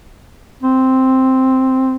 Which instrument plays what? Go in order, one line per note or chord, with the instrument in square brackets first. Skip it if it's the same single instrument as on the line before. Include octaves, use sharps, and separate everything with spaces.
[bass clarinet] C4